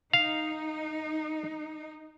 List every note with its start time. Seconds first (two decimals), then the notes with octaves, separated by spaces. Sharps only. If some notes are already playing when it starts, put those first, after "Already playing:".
0.13 D#4 F5